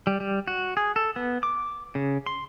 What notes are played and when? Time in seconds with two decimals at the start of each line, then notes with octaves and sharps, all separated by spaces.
0.07 G3
0.20 G3
0.48 F#4
0.77 G#4
0.96 A4
1.16 B3
1.43 D6
1.95 C#3
2.26 C6